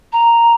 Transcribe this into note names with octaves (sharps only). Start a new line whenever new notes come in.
A#5